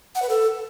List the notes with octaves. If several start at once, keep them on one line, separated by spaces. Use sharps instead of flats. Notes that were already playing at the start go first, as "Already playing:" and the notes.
F#5
B4
A4